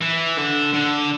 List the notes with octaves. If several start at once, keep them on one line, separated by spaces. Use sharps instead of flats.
E3
D3
D3